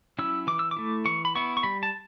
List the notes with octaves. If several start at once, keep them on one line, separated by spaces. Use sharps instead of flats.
F#3 C#4 E4 E6
E3 D6
E6
D6
A3 E4
E3 C#6
B5
B3 E4 C#6
C#6
G3 B5
A5